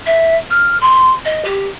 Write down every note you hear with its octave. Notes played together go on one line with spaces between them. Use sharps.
E5
F6
C6
D#5
G4